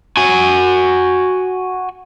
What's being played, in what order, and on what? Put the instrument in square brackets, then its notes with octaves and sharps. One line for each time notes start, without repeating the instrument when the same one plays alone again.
[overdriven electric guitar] F#4 G#5